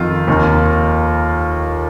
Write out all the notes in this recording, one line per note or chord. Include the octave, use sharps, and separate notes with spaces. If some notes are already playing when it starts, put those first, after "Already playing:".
Already playing: F2 D#3 F4
D#2 D#3